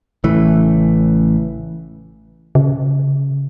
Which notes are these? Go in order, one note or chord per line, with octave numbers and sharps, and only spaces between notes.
A1 C#3 E3 A3
C#3